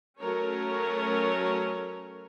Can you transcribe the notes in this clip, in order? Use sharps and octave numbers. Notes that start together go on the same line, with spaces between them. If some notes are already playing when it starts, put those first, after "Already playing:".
F#3 A3 C#4 A#4 C#5